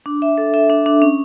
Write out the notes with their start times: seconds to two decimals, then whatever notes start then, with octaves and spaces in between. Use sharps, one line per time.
0.06 D4
0.22 E5
0.38 A4
0.54 E5
0.70 D4
0.86 D4
1.02 C#4